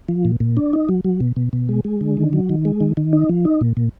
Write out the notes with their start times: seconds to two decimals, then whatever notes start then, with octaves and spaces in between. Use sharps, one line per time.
0.09 F3
0.25 A#2
0.40 A#2
0.57 D4
0.73 D#4
0.89 F#3
1.05 F#3
1.20 B2
1.36 B2
1.53 B2
1.69 G#3
1.85 G#3
2.01 D3
2.17 D#3
2.33 F#3
2.49 D#3
2.65 G#3
2.81 D#3
2.97 D#3
3.13 D#4
3.29 F3
3.45 D#4
3.61 A#2
3.77 A#2